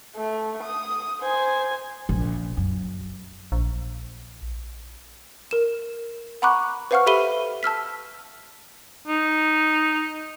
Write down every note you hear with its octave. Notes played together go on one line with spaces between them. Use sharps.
A3
D#6
C5 G#5
A#1
F#2
A#1
A#4 E7
F#5 A#5 B5 C#6 D6 F#6
B4 C5 F5 F#5 C#6 F6
G4 A4 E5 B5 D#7 G7
A5 E6 F6 B6
D#4